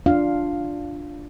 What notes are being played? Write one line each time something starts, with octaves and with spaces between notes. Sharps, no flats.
D4 F4 F5